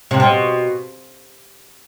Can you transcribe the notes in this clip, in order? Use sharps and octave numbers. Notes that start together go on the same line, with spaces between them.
C3
B2